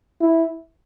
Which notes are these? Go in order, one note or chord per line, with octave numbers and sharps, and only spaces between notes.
E4